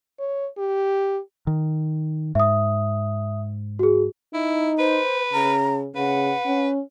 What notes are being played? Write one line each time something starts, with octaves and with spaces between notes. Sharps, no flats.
C#5
G4
D#3
G#2 E5 D#6
F#4 G#4
D#4 E4
B4 C5
C#3 A#5
C#3 B4 F#5
C#4